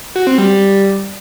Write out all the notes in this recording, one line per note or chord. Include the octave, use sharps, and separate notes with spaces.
F#4
C4
G3